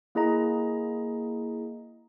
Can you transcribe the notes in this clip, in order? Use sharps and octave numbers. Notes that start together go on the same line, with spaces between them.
A#3 E4 G#4 D#5 A#5